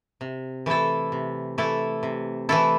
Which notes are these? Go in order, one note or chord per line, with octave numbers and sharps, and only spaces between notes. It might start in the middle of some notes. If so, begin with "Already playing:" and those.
C3
E3 A3 E4 A4
C3
E3 A3 E4 A4
C3
E3 A3 E4 A4